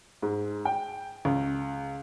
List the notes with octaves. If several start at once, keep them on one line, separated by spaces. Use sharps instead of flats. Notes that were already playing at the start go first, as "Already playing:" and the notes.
G#2
G5
C#2